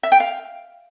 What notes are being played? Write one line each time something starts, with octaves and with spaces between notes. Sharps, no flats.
E5
G5
F5